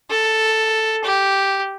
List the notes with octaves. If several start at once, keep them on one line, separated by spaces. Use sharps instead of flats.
A4
G4